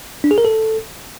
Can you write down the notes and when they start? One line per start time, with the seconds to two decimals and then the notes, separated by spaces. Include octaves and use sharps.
0.24 D4
0.31 G#4
0.38 A#4
0.45 A4